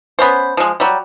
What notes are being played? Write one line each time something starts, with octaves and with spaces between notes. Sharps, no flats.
B3 C#4 C5
F3 G#3
F#3 G3